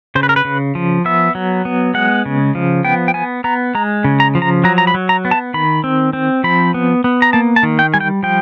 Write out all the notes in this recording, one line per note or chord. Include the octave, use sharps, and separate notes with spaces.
C#3 C5
B4
A#4
B4
C#3
F3
B3 E5
F#3
B3
G#3 F#5
C#3
F3
B3 G5
G5
B3 G#5
B3 A#5
G#3 A#5
C#3
A#5
F3
A#5
F#3 A#5
A#5
B5
F#3
A#5
B3
A5
D#3 B5
C4
C4
F3 B5
B3
B3
A#5
A#3 A5
A5
D#3
G5
G3 G#5
G5
F3 G5